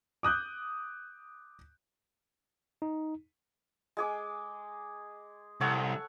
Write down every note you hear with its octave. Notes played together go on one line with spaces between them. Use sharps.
D6 D#6 F#6 G6
D#4
G#3 G#4 D6
C2 A4 C#5 F#5